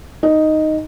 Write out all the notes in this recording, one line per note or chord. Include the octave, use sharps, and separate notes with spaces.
D#4